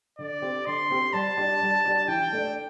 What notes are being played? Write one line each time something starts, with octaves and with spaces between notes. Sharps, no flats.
D3 D5
C4 G4
D3 C6
C4 G4
G3 A5
D4 G4
G3
D4 G4
E3 G5
A3 D4